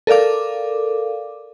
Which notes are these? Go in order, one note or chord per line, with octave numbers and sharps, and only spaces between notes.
A4 A#4 D5 F5 D6